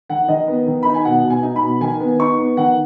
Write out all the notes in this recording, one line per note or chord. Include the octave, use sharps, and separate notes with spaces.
D#3 F#5
D#3 D#5
B3
D#3
D#4 B5
G#5
B2 F#5
B2
G#5
D#4
B5
B2
D#3 G#5
B3
D#4 C#6
B3
D#3 F#5